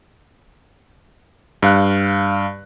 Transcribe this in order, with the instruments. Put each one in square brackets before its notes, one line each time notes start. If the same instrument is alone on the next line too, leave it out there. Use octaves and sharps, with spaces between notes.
[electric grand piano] G2 F5 F#6